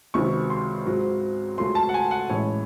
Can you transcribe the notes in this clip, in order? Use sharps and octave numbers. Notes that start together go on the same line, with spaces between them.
C#2 C3 D#3 F#3 C#6
C6
G#2 F#3 C4
C#2 C#3 F#3 A3 C6
A5
F#5
G#5
F#5
A1 A2 G#3 C#5